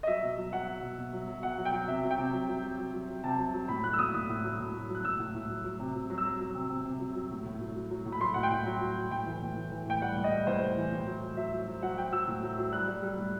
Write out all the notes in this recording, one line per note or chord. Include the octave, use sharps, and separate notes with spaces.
D#5
F#3 E5
B2
F#3
F#3 F#5
F#3
B2
B2
F#3
F#3
B2 F#5
F#3
G5
F#3
C3 E5
F#3
G5
C3
F#3
F#3
F#3
F#3
F#3
F#3
C3 A5
F#3
F#3
A2 B5
F#3 F#6
E6
A2 D#6
A2 D#6
A2
F#3
A2
F#3
F#3
F#6
A2 E6
A2
A2
F#3
F#3
C3
F#3
F#3
E6
F#3
F#3
C3
C3
C3
F#3
F#3
A2
A2
F#3
F#3
F#3
A2
B5
F#3 C6
A2 F#5
G5
A2
F#3
F#3
F#3
A2 G5
E3
A2
E3
E3
A2 G5
G3 F#5
A2
D#5
G3
A2 C5
A2
E3
A2
F#3
F#3
F#3 E5
F#3
F#3
F#3 F#5
F#3 G5
F#3 E6
A2
F#3
F#3
G3 F#6
G3
G3
A2